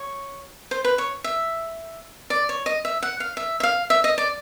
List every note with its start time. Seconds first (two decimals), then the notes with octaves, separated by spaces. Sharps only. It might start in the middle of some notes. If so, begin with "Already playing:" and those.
Already playing: C#5
0.71 C5
0.84 B4
0.98 C#5
1.24 E5
2.30 D5
2.49 C#5
2.66 D#5
2.85 E5
3.03 F#5
3.20 F5
3.37 E5
3.60 E5
3.63 F5
3.90 E5
4.04 D#5
4.18 D5